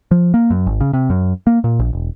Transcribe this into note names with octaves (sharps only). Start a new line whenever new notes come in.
F3
A#3
F#2
G#1
C#3
C3
F#2
A#3
A#2
A#1
E1